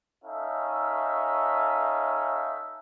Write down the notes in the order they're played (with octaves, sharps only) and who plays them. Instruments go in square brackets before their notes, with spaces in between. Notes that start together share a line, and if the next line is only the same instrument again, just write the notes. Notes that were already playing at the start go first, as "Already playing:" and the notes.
[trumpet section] C#4 D#4 A4 E5 F5